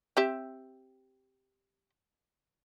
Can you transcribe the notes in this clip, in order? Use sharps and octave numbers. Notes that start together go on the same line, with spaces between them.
C4 G4 E5